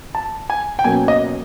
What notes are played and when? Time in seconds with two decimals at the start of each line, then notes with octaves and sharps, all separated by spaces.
0.15 A5
0.50 G#5
0.79 G5
0.84 B2 F#3 A#3 C#4 G#5
1.08 D#5